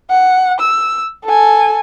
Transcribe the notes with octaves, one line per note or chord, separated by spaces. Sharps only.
F#5
E6
A4 G#5